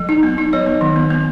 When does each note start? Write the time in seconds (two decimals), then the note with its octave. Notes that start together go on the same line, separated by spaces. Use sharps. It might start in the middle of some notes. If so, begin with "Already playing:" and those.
Already playing: F#3
0.09 D#4
0.23 B3
0.38 D#4
0.53 F#3 C#5
0.66 B3
0.81 D#3
0.96 B3
1.10 B3